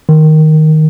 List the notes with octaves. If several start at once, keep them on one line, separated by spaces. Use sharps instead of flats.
D#3